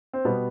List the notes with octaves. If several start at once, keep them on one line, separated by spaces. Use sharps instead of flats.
C4
B2 G3 B3